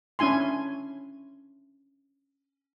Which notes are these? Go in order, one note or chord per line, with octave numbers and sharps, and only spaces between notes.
C#4 D4 E4 G#5 C6